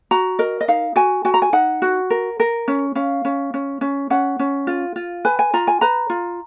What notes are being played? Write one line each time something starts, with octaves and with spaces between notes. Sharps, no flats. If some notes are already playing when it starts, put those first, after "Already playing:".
F#4 A#5
A#4 D#5
D#5
D#4 F5
F#4 G#5
F#4 G#5
A#5
G#5
D#4 F#5
F#4
A#4
A#4
C#4
C#4 F5
C#4
C#4
C#4
C#4 F#5
C#4
F4
F4
B4 G#5
G#5
F4 A#5
G#5
B4 A#5
F4